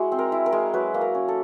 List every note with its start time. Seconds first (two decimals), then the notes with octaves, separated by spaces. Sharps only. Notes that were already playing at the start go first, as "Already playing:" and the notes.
Already playing: G#3 E4 F#4
0.12 C4
0.19 A#4
0.32 E4
0.46 A#4
0.52 G#3
0.74 F#3 B4
0.94 A#3
1.01 A#4
1.14 C#4
1.28 A4